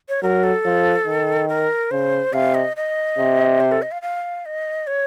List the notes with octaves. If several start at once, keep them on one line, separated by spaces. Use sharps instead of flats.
C#5
F#3 A#4
A4
F3
D#3
A#4
C#3 C5
C3 F5
D#5
D#5
C3
C5
A4
D#5
F5
F5
D#5
C#5